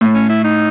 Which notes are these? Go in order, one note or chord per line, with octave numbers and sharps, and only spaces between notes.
A2
C#4
E4
D#4